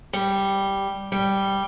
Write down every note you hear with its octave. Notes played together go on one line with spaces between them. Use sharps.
G3
G3